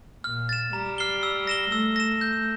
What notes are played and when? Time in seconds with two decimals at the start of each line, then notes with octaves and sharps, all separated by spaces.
0.24 A#2 F6
0.49 A6 E7
0.73 G3 A#5
0.98 F6 C7 G7
1.23 E6
1.47 A#6 E7 G7
1.72 A3 E6
1.96 A#6 E7
2.21 G6